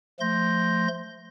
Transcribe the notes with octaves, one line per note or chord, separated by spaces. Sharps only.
F3 A3 C6 G6 A#6